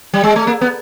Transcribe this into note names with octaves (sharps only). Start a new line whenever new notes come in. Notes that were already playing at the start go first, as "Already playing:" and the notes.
G3
G#3
A3
A#3
B3